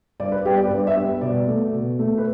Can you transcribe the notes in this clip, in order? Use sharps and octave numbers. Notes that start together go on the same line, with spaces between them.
G2 D5
B4
G3 B3 G4
D5
B4
G2 D5
E5
G3 B3
B2 D5
A3
B2
A3
B4